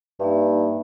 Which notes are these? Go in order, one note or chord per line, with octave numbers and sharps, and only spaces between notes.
G2 A#3 D#4 E5